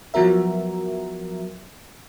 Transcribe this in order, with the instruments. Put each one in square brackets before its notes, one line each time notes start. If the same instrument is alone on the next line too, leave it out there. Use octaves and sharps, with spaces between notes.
[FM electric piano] F3 F#3 B3 F#4 A#4 E5